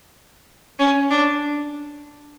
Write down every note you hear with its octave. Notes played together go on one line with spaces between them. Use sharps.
C#4
D4